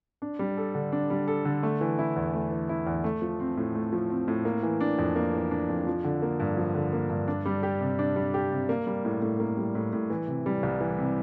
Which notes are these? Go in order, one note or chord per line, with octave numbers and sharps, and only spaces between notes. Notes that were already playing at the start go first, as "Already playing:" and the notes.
D4
G3
A4
D3
D4
G3
A4
D3
A3
E3
E4
E2
A3
E3
E4
E2
A3
F3
C4
A2
A3
F3
C4
A2
A#3
E3
D4
F2
A#3
E3
D4
F2
F3
D3
A#3
G2
F3
D3
A#3
G2
D4
G3
G4
C3
D4
G3
G4
C3
A#3
G3
A2
A2
A#3
G3
A2
A2
E3
C3
G3
C2
E3
C3